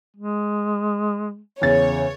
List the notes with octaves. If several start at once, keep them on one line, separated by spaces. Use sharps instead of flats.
G#3
E2 C#3 C#5 A6